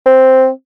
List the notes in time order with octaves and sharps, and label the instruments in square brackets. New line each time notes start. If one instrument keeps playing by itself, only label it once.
[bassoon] C4